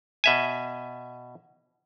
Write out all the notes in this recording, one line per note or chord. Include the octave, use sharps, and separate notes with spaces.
B2 E5 G#5